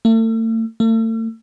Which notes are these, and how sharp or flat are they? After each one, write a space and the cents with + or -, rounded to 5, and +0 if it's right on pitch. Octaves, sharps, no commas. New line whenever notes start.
A3 +40
A3 +40